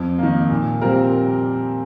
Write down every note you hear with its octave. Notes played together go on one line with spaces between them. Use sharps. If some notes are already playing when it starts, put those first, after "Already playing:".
Already playing: F2
D#3 A#3
A#2
G3 C4 F4 A#4